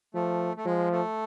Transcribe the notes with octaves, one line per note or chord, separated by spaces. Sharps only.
F3 A3
A3
F3 G#3
A3